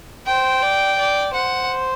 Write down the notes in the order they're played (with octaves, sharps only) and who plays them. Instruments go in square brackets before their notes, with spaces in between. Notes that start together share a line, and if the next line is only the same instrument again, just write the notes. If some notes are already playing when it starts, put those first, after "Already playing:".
[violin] C5 [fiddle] G5
[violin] D5
D5
[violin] C5 [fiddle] F#5